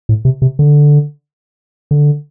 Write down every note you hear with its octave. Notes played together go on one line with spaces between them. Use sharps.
A2
C3
C3
D3
D3